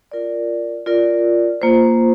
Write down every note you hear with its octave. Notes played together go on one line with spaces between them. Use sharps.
F4 A#4 D5
F4 A#4 D5
A#3 F4 C5